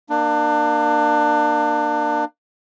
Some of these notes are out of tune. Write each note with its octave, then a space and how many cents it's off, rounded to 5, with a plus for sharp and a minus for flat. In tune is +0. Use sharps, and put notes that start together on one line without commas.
A#3 +5 D4 +30